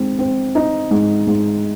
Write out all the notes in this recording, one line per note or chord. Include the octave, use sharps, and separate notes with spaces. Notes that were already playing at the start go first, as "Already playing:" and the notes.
Already playing: G#2 C4
C4
D#4
G#2
G#2